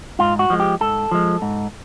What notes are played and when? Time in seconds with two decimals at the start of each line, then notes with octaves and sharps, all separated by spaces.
0.19 G#2 F4
0.39 F#4
0.50 F3 G#3
0.60 G4
0.81 G#2 A4
1.11 F3 G#3
1.42 G#2